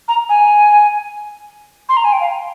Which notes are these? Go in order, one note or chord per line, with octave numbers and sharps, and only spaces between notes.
A#5
G#5
C6
A#5
G#5
G5
F5